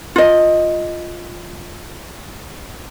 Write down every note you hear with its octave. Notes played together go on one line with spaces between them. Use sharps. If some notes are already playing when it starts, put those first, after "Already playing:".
F4 D#5